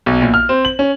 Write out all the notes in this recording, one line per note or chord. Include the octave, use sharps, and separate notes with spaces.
B1
A#1
F6
C4
F#7
C#4